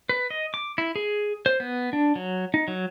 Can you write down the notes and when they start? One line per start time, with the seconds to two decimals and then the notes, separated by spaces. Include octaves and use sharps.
0.09 B4
0.30 D#5
0.54 D6
0.78 E4
0.96 G#4
1.46 C5
1.60 B3
1.93 D4
2.16 F#3
2.54 D#4
2.68 F#3